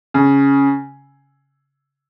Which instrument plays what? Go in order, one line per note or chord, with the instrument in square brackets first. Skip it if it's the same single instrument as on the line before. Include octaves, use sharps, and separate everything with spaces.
[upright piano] C#3